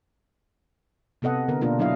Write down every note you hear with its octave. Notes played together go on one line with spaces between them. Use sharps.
C3 B3 A4 D#5 F#5
D3 B3 A#4
B2 A#3 D4 F4 A#4
F#3 D4 E4 D#5 F5